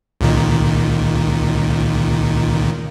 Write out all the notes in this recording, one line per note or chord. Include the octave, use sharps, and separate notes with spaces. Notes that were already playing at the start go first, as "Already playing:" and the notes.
C#2 A#2 D#3